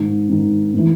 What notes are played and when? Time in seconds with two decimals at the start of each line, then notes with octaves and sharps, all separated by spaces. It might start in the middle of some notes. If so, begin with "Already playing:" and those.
Already playing: G#2 D#3
0.29 G#2 D#3
0.74 A2 E3